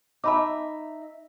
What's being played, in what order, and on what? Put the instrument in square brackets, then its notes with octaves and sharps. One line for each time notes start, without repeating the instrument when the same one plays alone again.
[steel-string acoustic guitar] D#4 E5 [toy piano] A5 B5 D6